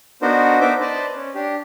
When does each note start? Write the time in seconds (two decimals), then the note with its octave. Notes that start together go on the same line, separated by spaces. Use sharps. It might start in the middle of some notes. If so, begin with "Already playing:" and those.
0.22 B3 D4 D#4 F#4 A#4 C5
0.61 B3 D4 D#4 C5 E5 D6
0.81 B4 C5 D5 D#5 A5
1.16 C#4
1.35 D4 G4